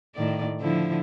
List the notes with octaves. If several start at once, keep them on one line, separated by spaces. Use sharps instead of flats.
A2 D#3 D5
D3 F3 E4